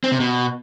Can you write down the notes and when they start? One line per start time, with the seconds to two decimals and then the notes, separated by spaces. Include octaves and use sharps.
0.04 C4
0.12 C3
0.20 B2